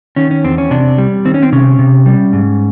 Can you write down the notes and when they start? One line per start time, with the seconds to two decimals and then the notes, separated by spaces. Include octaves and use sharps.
0.16 D#3 C#4
0.31 C#4
0.44 E2 C4
0.58 C#4
0.71 C3 D4
0.98 G3
1.25 D#3 C4
1.34 C#4
1.43 C4
1.52 C3 C#4
1.79 C3
2.06 G3
2.33 G#2